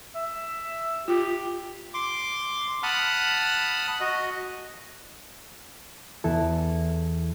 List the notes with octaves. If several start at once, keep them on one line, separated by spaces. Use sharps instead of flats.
E5
F4 G4
C6 D6
F#5 A5 B5 D#6 F6 F#6
F#4 D#5
E2 E3 E4 A4